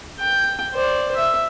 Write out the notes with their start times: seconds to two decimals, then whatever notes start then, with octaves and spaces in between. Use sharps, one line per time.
0.19 G5
0.73 C5 D5
1.16 E5